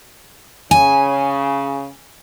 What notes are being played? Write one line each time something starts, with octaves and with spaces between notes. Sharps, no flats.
C#3 G#5